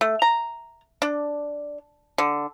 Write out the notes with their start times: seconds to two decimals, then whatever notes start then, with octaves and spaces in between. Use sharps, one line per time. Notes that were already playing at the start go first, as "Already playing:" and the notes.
0.01 A3
0.22 A#5
1.02 D4
2.18 D3